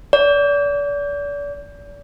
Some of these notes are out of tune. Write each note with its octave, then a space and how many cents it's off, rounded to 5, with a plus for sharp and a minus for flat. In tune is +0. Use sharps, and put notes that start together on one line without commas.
D5 -35